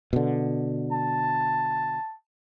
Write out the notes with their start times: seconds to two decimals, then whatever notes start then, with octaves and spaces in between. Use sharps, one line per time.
0.13 B2 D3
0.92 A5